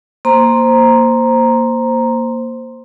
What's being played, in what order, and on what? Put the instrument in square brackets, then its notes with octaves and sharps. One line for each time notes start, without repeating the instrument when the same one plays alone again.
[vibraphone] A#3 C5 A#5 C6